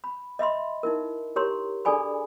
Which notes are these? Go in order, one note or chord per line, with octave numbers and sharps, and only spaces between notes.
B5
D#5 E5 B5 C6
D#4 E4 A#4
G4 A#4 C#5 A#5 C6
D4 G#4 A4 D5 G#5 B5